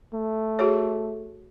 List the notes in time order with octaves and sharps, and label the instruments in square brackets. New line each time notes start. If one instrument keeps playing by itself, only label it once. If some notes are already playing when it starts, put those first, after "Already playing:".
[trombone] A3
[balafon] F#4 G#4 C#5